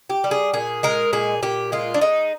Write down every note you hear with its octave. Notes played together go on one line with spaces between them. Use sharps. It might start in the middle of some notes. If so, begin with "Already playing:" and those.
G4
G3
G#4
A#2 G#4
G#3 A#4
A#2 G#4
A#2 G4
G#3 F4
D4
G#3 D#4